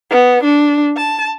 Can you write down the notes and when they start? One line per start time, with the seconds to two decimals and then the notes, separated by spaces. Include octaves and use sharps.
0.11 B3
0.43 D4
0.97 A5